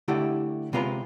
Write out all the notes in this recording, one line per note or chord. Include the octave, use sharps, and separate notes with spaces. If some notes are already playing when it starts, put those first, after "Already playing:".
D3 A3 E4 G4
C3 G#3 B3 F4 B4 A#5